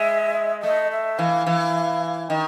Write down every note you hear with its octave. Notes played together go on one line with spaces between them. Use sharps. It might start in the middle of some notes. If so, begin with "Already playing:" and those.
Already playing: G#3 E5
A3 D#5
E5
E3 F5
E3
D#3